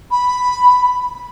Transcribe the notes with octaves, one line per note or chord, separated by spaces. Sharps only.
B5